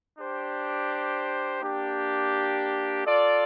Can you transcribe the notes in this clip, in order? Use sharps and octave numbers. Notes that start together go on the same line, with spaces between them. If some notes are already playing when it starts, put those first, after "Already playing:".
D4 G4 C5
A#3 D4 G4
F4 A4 D5